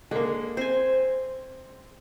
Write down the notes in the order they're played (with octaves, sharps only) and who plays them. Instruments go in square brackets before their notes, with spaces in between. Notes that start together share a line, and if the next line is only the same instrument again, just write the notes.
[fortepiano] D3 A#3 [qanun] G#3
[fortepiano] C4 [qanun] C5 G#5